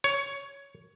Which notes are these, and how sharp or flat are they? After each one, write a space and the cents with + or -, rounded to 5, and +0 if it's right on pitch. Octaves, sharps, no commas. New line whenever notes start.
C#5 +10